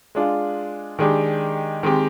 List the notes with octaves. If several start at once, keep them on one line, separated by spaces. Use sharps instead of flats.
G#3 D4 F4
D#3 G#3 D4 G4
D#3 G#3 C4 G4